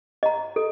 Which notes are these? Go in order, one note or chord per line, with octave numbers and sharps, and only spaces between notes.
D#5 A#5
A4